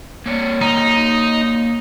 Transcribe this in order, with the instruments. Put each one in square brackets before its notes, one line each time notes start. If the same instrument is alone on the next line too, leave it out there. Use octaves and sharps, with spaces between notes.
[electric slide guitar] A#3 C#5 D5
[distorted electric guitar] D#4